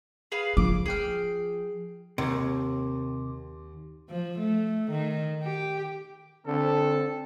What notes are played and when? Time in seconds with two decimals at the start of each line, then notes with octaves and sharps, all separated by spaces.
0.32 G#4 B4 F5
0.57 F3 D6
0.86 G#4 G5 F6
2.18 D#2 C3 C6 D6
4.09 F3
4.39 A3
4.91 D#3
5.43 G4
6.47 D3 C4 A4